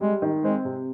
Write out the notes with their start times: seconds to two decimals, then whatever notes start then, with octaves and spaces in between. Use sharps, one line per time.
0.01 G3 G#3
0.22 D#3
0.43 G#3 C4
0.65 C3